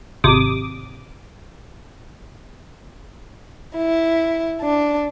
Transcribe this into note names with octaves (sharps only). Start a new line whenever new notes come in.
G#1 C3 D6 D#6
E4
D4